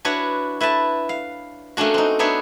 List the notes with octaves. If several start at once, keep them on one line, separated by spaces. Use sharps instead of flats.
D4 E4 F#4 B4 C#5
E4 B4 E5 A5
F5
A3 A#3 C#4 D4 F#4
C4 D#4
B3 D4 D#4 C#5 E5